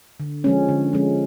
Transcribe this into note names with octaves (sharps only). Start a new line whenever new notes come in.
D3
F3 G#3 C#4
D3
F3 G#3 C#4